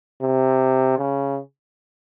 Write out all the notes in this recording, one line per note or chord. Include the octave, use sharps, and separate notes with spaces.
C3
C#3